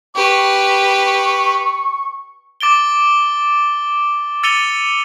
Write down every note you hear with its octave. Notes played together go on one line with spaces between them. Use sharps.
G4 B4 C#6
D6 A6 D7 G7
E6 A6 C#7 D#7 F7 G7